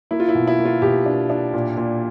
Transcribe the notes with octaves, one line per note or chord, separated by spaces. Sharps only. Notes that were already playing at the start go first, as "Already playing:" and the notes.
A#3 E4
F4
E4
B2
E4
A#3
F4
B2 G4
D4
D4
A#2
A#2